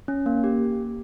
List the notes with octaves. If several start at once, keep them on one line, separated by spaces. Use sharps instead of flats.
C#4
A#3
G4